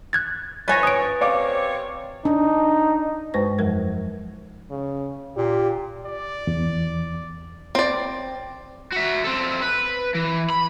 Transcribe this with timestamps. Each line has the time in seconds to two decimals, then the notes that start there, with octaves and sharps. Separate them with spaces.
0.13 F#6 G#6 A6
0.68 F3 C#4 B4 C#5 G#5 A6 A#6
0.83 D#6 D7
1.21 C3 C4 C#5 D5 F5 D6
2.25 D4 D#4
3.34 G2 G#3 B4 C5 C#6 A#6
3.58 F2 F3 F#3 A#4 G#6
4.70 C#3
5.37 A#2 G4
6.05 D5
6.47 E2
7.75 C4 D5
8.92 F#4 E5
9.24 C4 A4
9.62 B4
10.14 E3
10.50 B5